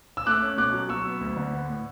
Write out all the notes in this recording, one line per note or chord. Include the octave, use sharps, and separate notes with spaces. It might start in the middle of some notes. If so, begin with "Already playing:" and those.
E6
A3 D6 F#6
C#4
B2 D6 F#6
F#3
F#3 C#6 E6
B3
D2
D3
B3
A2